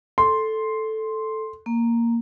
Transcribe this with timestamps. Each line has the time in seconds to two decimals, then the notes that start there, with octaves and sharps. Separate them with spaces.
0.18 A4 C6
1.66 A#3